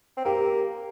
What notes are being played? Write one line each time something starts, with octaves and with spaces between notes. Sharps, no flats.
C4
A#3 G4